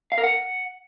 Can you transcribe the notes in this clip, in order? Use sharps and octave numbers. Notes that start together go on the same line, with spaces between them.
F5
A#4
F#5